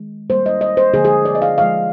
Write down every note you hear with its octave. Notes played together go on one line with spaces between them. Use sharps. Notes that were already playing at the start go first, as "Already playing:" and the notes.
Already playing: D#3 G#3
D#3 G3 A#3 C5
D#5
D#5
C5
D3 F3 A#3 G#4
G#4
D5
D#5
F5
D3 F3 G#3 F5